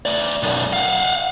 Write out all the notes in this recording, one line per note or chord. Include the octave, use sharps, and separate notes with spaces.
A3 D5
B1 F#2
F5 F#5